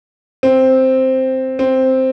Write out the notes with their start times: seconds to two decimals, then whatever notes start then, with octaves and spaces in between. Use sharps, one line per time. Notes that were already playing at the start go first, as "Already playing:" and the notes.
0.43 C4
1.59 C4